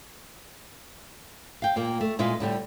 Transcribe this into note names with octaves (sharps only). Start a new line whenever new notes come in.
F5 G5
A#2 A#3
A3
A#2 G#3 E4 B4 F5
A2 D3 G3